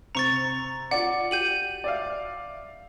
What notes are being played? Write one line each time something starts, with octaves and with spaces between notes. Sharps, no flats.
C3 C5 A#5 C#6 A6 C#7
F4 D5 F#5
G4 G6 D#7 F#7
D5 E5 F5